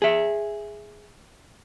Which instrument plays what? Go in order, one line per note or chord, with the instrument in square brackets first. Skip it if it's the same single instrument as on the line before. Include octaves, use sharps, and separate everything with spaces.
[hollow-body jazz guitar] G#4 E5